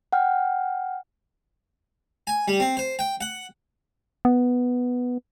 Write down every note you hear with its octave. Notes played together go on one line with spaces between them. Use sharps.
F#5 G5 F6
G#5
G3
C4
C5
G5
F#5
B3